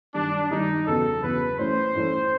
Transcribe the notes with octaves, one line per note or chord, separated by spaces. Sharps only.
G2 D#3 G3 D4
G2 D#3 G3 D#4
E2 C#3 F#3 B3 A4
E2 C#3 F#3 B3 B4
A2 E3 A3 C#4 C5
A2 E3 A3 C#4